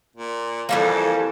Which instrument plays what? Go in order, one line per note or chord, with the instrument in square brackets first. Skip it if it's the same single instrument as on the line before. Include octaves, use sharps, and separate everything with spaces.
[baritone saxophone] A#2
[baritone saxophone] F2 [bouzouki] E3 G3 A#3 [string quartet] A4